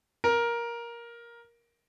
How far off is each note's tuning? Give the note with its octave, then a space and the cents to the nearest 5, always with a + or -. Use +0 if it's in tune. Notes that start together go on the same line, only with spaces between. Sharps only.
A#4 +10